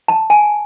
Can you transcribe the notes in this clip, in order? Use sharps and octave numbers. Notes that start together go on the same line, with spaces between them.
A5
G#5